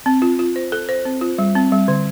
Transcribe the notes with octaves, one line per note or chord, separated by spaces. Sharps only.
C4
F4
F4
C5
A4
C5
C4
F4
G3
C4
G3
D3